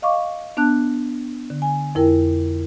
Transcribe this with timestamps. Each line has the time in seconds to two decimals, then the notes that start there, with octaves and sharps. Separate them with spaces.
0.02 D#5 F5 C#6 D6
0.57 B3 D4 A5 F#6
1.50 D3
1.62 G#5
1.95 F2 E4 A#4 G5